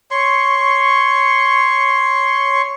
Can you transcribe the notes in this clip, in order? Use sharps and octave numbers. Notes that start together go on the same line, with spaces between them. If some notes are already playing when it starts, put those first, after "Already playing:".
C#5 C6 C#6